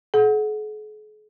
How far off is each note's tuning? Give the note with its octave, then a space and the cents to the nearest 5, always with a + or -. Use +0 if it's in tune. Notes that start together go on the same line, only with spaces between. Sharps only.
G#4 +45 F#5 -10